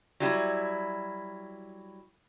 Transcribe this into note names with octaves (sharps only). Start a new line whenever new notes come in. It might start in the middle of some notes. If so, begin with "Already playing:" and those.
F#3 G3 E4